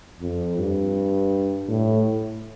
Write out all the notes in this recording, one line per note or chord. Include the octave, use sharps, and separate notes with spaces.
F2
G2
A2